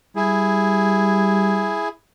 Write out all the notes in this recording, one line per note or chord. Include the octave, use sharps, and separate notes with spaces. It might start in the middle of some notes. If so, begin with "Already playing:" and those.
G3 E4 G#4